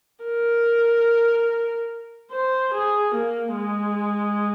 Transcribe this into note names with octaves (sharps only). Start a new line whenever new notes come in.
A#4
C5
G#4
A#3
G#3